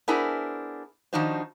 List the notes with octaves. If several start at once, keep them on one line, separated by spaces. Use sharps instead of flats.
B3 D4 E4 G#4 A#4 C5
D#3 F3 D4 D#4 F#4 C5